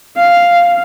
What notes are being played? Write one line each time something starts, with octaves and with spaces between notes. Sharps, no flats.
F5